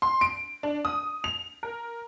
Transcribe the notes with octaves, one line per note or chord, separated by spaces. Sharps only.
C6
D7
D4
D#6
F7
A#4